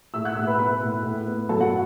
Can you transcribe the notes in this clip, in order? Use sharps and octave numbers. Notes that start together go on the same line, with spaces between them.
A2 E5 E6
F#5 F#6
A2 E5 E6
B4 B5
B3 B4 B5
A2
A2
B3
F#3 A4 A5
F#4 F#5